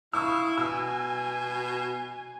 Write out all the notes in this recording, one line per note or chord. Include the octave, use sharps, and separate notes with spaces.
E4 F5 C#6 D#6 E6
B2 G#5 E6